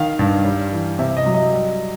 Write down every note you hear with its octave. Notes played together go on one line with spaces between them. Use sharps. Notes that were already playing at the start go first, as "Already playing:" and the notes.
Already playing: D#3 F5
G2
G3
E3
C3 E5
D#5
F#3
D#5
G3